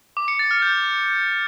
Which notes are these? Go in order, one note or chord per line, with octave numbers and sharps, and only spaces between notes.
D6
C#7
A6
F6
G6